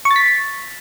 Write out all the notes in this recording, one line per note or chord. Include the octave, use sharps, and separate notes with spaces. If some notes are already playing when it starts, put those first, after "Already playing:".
C#6
A6
B6